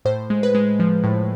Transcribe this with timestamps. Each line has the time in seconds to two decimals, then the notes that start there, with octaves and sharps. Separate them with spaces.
0.05 A2 C5
0.30 G#3
0.43 B4
0.55 G#3
0.80 F3
1.04 A2